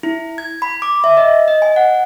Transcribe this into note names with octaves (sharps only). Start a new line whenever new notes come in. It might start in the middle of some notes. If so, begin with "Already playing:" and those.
E4
G#6
B5
D6
E5
D#5
D#5
G#5
F#5